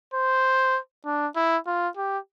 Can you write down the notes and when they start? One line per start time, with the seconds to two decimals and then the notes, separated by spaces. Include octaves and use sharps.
0.14 C5
1.05 D4
1.36 E4
1.67 F4
1.97 G4